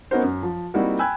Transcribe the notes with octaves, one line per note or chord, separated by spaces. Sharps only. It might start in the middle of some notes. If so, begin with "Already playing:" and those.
B3 C#4 D#4 F#4 A#4 C5
F#2
F3
G3 A#3 C4 D#4 E4 F#4
G5 G#5 B5 E6 F#6 G#6